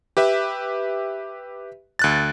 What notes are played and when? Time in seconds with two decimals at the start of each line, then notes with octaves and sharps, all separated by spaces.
0.17 G4 B4 E5
1.99 D2 F#6 A6